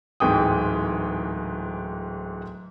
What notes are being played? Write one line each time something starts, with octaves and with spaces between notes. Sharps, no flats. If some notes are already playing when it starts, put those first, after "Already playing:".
D1 G#2 E3 G5 D#6